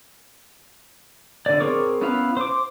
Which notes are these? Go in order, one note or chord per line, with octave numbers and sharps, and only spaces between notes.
D3 D5
C4 G#4 A#4 C#5 D6
B3 C#4 E4 B4 F5
C5 D6